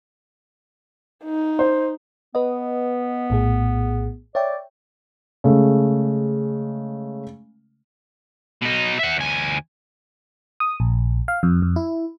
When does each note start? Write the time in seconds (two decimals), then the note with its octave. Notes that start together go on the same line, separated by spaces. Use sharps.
1.24 D#4
1.59 C5
2.35 B3 B4 D#5
3.30 A#1 A2 G#4
4.35 C#5 D5 E5 G5
5.44 C#3 G#3 A3
8.62 B2 D#4
8.99 E5 F#5
9.17 D2 G#5
10.60 D#6
10.80 A#1
11.28 F5
11.43 F2
11.62 F2
11.76 E4